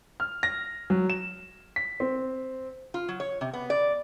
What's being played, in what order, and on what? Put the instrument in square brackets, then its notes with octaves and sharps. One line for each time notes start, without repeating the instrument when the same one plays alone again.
[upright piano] F6
A#6
F#3
E7
B6
C4
[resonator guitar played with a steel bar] F4
F#3
C#5
C3
B3
D5